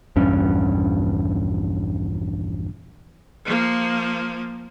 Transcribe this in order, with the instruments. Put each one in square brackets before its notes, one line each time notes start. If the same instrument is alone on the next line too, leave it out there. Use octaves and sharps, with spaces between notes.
[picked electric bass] A#1 E2 G2 C#4
[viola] F3 A#3